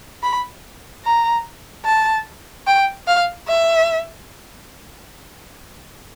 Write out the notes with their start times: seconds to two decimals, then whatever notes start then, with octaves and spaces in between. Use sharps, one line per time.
0.23 B5
1.04 A#5
1.85 A5
2.66 G5
3.07 F5
3.48 E5